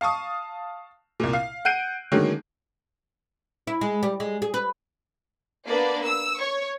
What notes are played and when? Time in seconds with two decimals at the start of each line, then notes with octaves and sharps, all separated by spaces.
0.01 F5 A5 C#6 D#6
1.20 C2 A#2
1.33 F5
1.65 F#5 F#6 G6 C7 D7 D#7
2.12 D3 D#3 F#3 G#3 A#3 C#4
3.67 E4
3.81 G#3
4.03 G3
4.20 G#3
4.42 G#4
4.54 B4
5.68 A#3 B3 D4 B4 D5
6.06 E6
6.40 C#5 C#6